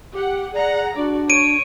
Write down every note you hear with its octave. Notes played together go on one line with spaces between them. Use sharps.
G4 F#5
G#4 D5 F#5 A#5
D4 F#4 D5
C#5 D7 D#7